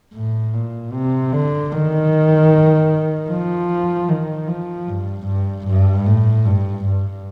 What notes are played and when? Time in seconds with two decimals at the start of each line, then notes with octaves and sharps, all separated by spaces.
0.14 A2
0.53 A#2
0.92 C3
1.32 D3
1.72 D#3
3.30 F3
4.09 D#3
4.48 F3
4.88 G2
5.27 G2
5.67 G2
6.06 A2
6.45 G2
6.85 G2